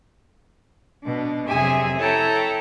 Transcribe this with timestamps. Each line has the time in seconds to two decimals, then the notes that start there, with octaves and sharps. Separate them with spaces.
1.04 B2 D4
1.48 F2 C3 F#3 G#4 E5 G#5
1.98 E4 A4 C#5 G5 A5 A#5